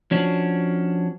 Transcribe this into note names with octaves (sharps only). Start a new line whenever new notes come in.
F3 C#4 D4 F#4